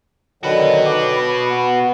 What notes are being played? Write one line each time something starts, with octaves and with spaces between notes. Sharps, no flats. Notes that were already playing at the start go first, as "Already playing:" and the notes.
D3 D#3 F#3 F#4 B4
D6
B5
B3